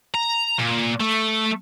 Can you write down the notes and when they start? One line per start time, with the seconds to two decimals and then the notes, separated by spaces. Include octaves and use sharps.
0.14 A#5
0.59 A#2
1.00 A3